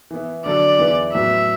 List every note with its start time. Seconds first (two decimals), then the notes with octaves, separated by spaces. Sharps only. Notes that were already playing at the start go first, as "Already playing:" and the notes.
0.11 E3 B3 E4
0.46 D3 F#3 D4 A4 D5
0.79 E2 E3 B3 E4 B4
1.13 A2 F#3 B3 E5